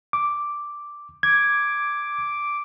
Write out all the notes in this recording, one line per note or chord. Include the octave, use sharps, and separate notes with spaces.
D6
D6 G#6